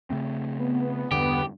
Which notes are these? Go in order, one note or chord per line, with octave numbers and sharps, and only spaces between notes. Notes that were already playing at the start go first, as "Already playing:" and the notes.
C#3 A3 C4
B3
E2 G2 D3 G4